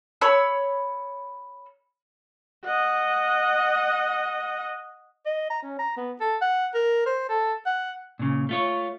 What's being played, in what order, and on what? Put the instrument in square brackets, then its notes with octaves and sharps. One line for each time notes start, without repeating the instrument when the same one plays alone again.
[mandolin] C#5 B5 E6
[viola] D#5 F#5
[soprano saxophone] D#5
A#5
C#4
A#5
B3
A4
F#5
A#4
C5
A4
F#5
[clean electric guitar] A#2 C#3
A3 F4 C#5